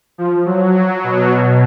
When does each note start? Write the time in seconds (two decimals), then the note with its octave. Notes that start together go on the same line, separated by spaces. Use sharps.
0.18 F3
0.46 F#3
0.75 F#3
1.04 B2
1.33 B2